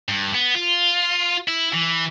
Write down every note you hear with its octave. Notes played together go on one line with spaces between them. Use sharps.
G2
B3
F4
E4
E3